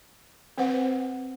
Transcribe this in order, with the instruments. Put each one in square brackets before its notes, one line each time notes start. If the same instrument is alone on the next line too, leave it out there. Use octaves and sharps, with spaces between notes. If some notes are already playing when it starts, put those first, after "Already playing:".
[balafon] C4 B4 C5 F#5